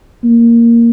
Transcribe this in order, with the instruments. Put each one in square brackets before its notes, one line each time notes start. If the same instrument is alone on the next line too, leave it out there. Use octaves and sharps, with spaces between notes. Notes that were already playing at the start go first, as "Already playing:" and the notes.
[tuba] A#3